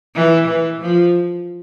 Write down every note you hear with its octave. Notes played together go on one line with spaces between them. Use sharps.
E3
E3
F3